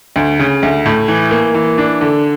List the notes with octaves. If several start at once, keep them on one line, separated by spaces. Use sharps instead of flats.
D2
C#3
D2
A2
E3
A#3
E3
D4
D3